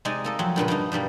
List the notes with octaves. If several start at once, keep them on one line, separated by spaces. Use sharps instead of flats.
C3 G#3 D#4 D5 G#5
A#3 A4 D#5
F2 F#3 C4
G2 A#2 C#3 B4
G2 F#3 A#3 D#4
G2 B2 G3 A#3